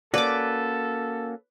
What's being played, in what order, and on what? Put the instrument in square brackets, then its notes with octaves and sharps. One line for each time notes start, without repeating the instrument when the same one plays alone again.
[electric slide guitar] A#3 C#4 F#4 [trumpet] A4 [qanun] B4 D6 [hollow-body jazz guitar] D5